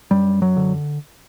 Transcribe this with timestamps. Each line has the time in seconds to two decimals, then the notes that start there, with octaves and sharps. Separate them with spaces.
0.11 F#2 G3
0.42 F#3
0.57 D3